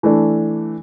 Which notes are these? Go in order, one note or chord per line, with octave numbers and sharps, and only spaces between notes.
E3 A3 D4